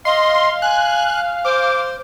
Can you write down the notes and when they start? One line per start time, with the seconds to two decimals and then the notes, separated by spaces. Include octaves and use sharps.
0.05 D#5 F5 C6
0.62 G#5 F#6
1.45 C5 D6